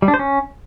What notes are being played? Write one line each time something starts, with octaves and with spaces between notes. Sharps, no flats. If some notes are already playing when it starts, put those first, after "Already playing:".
G3
D4
C5
C#4